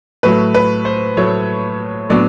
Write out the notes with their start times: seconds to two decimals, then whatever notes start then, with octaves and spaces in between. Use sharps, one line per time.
0.23 A2 F#3 A3 B4
0.54 B4
0.85 C5
1.17 A2 F#3 A3 C#5
2.10 A2 F#3 B3 D4 D5